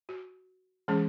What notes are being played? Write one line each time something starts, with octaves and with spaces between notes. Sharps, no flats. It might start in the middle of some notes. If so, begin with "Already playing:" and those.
F#4
E3 G#3 C#4 G#4